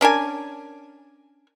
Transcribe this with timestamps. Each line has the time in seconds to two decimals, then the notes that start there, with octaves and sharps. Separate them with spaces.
0.01 C#4 D4 A#4 G#5